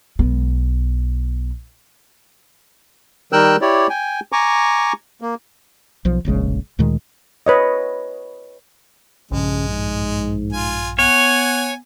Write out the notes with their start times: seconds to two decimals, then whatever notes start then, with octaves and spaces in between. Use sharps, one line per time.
0.19 B1 B3
3.33 D#3 G3 A#4 G5 E6 F#6
3.61 E4 G4 C#5 D5
3.89 G5 G#5
4.32 G#5 A#5 C#6 D6
5.21 A#3
6.05 B1 F3
6.25 F1 A#1 C#3 G#3
6.79 D2 A#2 D#3 G#3
7.46 B4 C#5 D#5
9.31 A#1 G2 C#3 F3 G#3
9.69 G#2
10.53 F4 G#5
10.99 B3 C#5 F#5 G#5